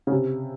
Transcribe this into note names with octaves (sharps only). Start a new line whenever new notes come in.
C#3
C3